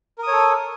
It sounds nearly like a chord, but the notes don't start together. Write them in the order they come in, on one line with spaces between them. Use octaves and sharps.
A#4 D#6 C#5 A4